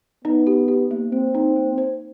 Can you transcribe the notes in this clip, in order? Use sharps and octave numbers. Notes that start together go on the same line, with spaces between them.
B3 D#4
G4
G4
A#3
A#3 C4
D#4
A#3
C5